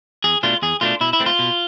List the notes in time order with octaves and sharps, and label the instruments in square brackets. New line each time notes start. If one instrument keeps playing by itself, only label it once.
[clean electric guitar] E2 G#4
B2 A3 D4 F4
E2 G#4
B2 A3 D4 F4
B2 E4
E4
A3 C4
F4
B2